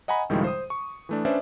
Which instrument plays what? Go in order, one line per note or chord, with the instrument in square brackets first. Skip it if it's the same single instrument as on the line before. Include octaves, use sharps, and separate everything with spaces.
[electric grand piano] D#5 F#5 G#5 A#5 B5
C#2 A2 D#3 F3 G3 G#3
C5 D#6
C#6
E3 A3 D4
C#4 D4 B4 C5 D5 E5